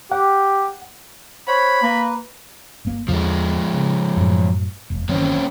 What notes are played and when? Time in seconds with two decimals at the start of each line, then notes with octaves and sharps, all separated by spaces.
0.12 G4 F#5
1.48 C5 C#5 F#5 B5
1.83 A#3 B4
2.85 G1 A#3
3.08 E2 D3 F3 G#3
3.73 C#3
4.16 F#2 A2
4.90 E1
5.09 G1 D#3 E3 A#3 C4 C#4